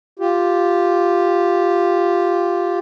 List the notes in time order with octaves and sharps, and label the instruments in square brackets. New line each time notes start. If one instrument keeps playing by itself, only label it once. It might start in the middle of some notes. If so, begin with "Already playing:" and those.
[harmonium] F4 G4